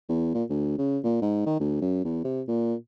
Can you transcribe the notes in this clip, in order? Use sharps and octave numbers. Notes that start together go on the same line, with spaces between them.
E2
A#2
D2
C#3
A#2
G#2
D#3
D2
F#2
E2
C3
A#2